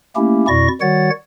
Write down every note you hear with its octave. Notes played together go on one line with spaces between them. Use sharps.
A3 A#3 C#4 E4 G4
F2 B2 E4 D5 C#6 A#6
D#3 G3 F#4 C#5 F#5 A6